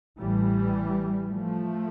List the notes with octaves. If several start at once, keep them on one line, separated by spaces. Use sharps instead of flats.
A1 A2 E3 G3
F3 A3